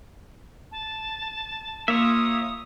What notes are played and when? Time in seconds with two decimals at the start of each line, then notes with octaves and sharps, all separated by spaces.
0.72 A5
1.88 A#3 F4 C#5 E5 D#6